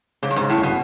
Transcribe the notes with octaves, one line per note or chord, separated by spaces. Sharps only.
G#2 C#3
G2
G#2
C#3
A2
G1 B2